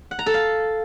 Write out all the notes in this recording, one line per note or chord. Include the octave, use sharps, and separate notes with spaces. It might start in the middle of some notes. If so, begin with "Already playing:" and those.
F#5
A#5
A4
F5